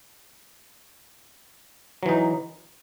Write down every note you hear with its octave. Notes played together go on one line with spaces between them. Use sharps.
E3 F#3 D#4